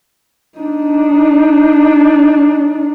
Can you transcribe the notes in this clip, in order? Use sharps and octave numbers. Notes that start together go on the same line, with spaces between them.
D4 D#4